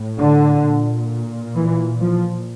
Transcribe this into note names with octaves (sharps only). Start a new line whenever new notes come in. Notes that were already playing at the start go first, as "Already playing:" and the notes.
Already playing: A2
D3
A#2
E3
F3